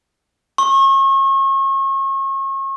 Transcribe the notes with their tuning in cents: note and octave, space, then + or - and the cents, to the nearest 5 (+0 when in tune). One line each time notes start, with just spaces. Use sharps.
C#6 -35